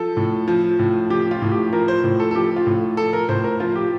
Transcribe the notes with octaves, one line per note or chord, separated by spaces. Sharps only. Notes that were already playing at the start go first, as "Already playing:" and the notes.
Already playing: F3 A4
A2
F3
A2
F3 G4
F4
A2
G4
F3 A#4
C5
A2
A4
A4
F3 G4
F4
A2
F3 A4
A#4
A2 C5
A#4
F3 F4
G4